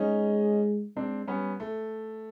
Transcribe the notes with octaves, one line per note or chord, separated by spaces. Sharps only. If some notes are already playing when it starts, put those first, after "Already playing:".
Already playing: G#3 C#4 D#4
G#3 C4 D4
G3 B3 C#4
A3